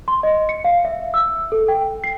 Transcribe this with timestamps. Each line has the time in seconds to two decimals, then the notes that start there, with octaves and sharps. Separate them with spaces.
0.08 C6
0.23 D#5
0.49 C#7
0.64 F5
0.85 E5
1.14 E6
1.52 A4
1.68 G5
2.04 C7